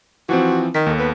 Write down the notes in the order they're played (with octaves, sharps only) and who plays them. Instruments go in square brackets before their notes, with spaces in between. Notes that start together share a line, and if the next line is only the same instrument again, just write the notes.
[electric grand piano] E3 F3 C4 [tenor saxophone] F#4
[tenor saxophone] D#3 [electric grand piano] B6
[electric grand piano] D#2 A4
[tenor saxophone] B3